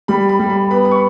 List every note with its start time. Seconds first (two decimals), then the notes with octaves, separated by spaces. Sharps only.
0.08 G3 B5
0.29 B5
0.39 G3
0.50 B5
0.70 B3 B5
0.85 B5
0.91 C#6